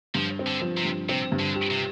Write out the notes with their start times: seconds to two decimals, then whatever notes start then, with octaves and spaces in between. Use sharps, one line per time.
0.15 G2 F3
0.39 C4
0.46 D3
0.62 F3
0.77 C3
0.85 G2
1.09 C3 C4
1.32 G2
1.40 D3
1.55 G4
1.70 C3